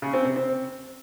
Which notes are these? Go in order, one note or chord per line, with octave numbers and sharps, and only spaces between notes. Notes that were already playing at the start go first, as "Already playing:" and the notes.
C#3
C4
C3
C4